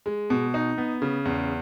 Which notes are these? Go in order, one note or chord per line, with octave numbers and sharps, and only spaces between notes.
G#3
B2
D#4
B3
C#3
E2